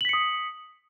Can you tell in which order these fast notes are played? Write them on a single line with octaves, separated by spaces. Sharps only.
F#7 B6 C#7 D#6